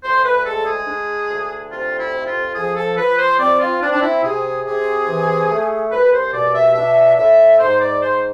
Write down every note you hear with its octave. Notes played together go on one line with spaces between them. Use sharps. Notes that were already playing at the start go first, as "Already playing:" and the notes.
D2 C5
B4
G#3 A4
G#4
D4
D2
C3 F4
E4
F2
F4
F3 G#4
A4
F3 B4
C5
C4 D5
F4
C4 D4
D4
E4
C3 G#4
C3 G#4
E3
A3
C2 B4
C5
B2 D5
E5
D4 E5
A2 E5
G#2 C5
D5
G#2 C5